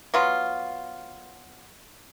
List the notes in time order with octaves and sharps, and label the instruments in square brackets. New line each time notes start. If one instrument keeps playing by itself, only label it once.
[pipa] F#3 B3 F4